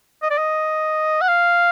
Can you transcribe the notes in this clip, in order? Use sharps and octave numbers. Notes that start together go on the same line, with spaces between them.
D#5
D5
D#5
F#5
F5